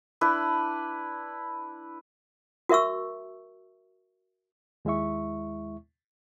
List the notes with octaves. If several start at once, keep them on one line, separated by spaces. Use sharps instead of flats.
D4 E4 B4
F#4 A#4 E5 C#6 E6
D#2 G#3 E4 E5 C#6